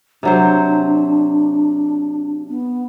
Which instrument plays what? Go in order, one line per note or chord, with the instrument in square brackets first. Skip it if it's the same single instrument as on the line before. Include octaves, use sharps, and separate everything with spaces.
[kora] C3 F#3 C5 [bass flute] D4
[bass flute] B3